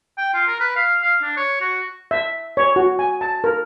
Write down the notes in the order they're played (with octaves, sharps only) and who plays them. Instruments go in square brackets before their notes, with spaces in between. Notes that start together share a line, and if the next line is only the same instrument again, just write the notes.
[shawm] G5
F4
A#4
B4
F5
F5
D4
C#5
F#4
[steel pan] E5
C#5
F#4
G#5
A5
A#4